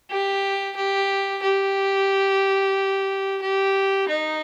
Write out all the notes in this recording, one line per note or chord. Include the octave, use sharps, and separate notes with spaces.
G4
G4
G4
G4
D#4